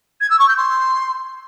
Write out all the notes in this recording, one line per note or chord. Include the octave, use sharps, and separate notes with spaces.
G#6
E6
C#6
G6
C6